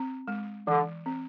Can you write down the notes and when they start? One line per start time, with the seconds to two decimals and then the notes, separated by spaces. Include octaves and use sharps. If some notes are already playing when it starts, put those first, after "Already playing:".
Already playing: C4
0.28 G#3
0.67 D3 E3
1.06 C4